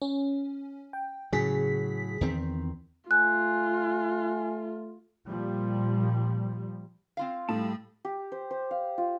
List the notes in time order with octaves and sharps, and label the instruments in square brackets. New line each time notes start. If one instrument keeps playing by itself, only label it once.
[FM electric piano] C#4
G5
[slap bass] A2 F#3 [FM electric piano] C#3 G#4 B6
[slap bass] E2 D#3 C4
[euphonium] A3 [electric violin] F4 [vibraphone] G#5 [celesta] F#6
[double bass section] A#2 F3 G3
[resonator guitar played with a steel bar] C4 F4 F5
[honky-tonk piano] A2 [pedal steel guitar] G3 A4 A5
[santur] G4
C5
C5
F5
F4